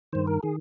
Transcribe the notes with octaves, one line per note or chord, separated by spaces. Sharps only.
G2 D#3 C5
A#4
D#3 G#4